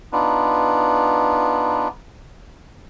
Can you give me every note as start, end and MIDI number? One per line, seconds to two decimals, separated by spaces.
0.13 1.88 59
0.13 1.88 62
0.13 1.88 63
0.13 1.88 65
0.13 1.88 71